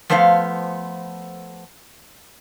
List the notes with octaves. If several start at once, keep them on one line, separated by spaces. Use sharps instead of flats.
F3 A3 B3 C5 E5 F5